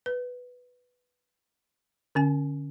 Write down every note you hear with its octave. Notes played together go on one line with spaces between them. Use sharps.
B4
D3 C#4 G#5